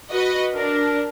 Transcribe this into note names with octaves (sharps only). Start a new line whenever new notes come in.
F#4 B4 D#5
D4 A#4